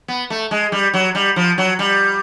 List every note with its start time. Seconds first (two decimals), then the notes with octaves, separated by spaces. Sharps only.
0.08 B3
0.30 A3
0.51 G#3
0.72 G3
0.94 F#3
1.15 G3
1.36 F3
1.58 F#3
1.79 G3